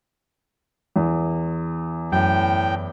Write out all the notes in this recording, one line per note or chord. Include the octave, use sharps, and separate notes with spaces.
E2
F#2 A2 G5 G6